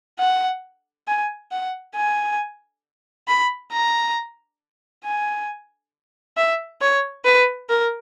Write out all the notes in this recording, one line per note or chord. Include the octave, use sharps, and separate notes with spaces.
F#5
G#5
F#5
G#5
B5
A#5
G#5
E5
C#5
B4
A#4